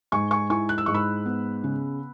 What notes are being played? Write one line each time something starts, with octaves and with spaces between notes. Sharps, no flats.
G#2 G#5 C#6
G#5 C#6
E4 G#5 C#6
F#6
E6
G#2 C#6
B5 E6
B3
C#3